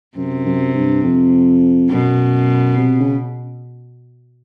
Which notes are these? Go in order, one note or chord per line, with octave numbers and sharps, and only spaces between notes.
F#2 C3
F#2
G2
F2
F#2 B2
C3
C#3